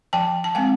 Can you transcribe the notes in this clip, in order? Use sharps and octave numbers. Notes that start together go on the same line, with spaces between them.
F3 G5 A5
A5
G#3 C4 F#5 G#5